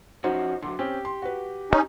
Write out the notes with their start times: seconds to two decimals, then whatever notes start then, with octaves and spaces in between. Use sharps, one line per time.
0.24 F3 C#4 D#4 F#4 C5
0.62 D3 E3 F#3 C6
0.79 C4 C#4 G4
1.05 C#4 C6
1.22 F#4 B4
1.71 D1 C#2 C#4 D#4